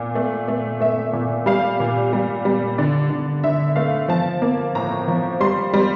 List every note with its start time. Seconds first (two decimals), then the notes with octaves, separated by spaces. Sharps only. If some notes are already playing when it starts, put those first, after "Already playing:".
Already playing: A#2
0.15 A3
0.48 A3
0.80 A3 E5
1.13 A#2
1.46 G3 F5
1.80 A#2
2.13 G3
2.45 G3
2.78 D3 D5
3.10 D3
3.44 D3 E5
3.76 A3 F5
4.08 F3 A5
4.42 A#3
4.75 A2 A#5
5.08 F3
5.40 G3 C6
5.74 G3